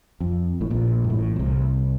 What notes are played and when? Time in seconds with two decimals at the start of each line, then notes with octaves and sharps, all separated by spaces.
0.20 F2
0.60 A1 A2
0.70 A#1 A#2
1.04 G2
1.10 A1 A2
1.36 A#2
1.40 C2 C3